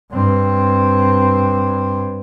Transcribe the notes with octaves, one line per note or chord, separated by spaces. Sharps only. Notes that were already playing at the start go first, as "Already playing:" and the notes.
G2 C4